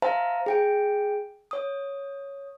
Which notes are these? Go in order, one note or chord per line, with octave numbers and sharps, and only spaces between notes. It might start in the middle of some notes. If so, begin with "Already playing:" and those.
C5 E5 F5 A5 A#5
G#4 G5 D7
C#5 D#6